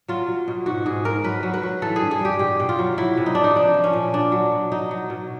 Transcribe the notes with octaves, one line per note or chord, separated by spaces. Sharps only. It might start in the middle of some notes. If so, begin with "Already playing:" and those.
F#3 F4
F#3
B2
G#2 F#4
G#2 G#4
G#2 A#4
F#3 B4
F#3
B4
F#3
E3 A4
G#4
G2
G#4
G3 G4
B2 G4
B2
F4
F#3
F#3 E4
C3
D#4
C3 D4
D#4
F3 D4
F3
C#4
A#2
F#3 D4
F#3
B2
F#3 D#4
F#3
B2